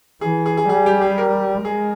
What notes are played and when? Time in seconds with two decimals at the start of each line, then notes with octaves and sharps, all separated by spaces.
0.21 E3 G#4
0.46 G#4
0.57 G#4
0.69 G3 G#4
0.86 G4
1.02 G#4
1.18 A#4
1.65 G#3 G#4